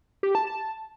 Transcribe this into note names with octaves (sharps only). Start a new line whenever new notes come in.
G4
A5
A5